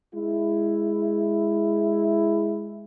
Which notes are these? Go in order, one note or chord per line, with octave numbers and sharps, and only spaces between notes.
G#3 E4